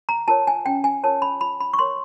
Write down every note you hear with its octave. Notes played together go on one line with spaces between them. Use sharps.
A#5
F4 A#4 C#5 A5
G#5
C#4 G5
G#5
F4 A#4 C#5 A5
B5
F4 B5
B5
C#6
A#4 C#5 C6